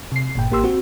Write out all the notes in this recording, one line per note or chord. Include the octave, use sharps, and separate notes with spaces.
C3 C7
G1 A#2 G5
A1 A#3 G4 C6 E6
C4 F#4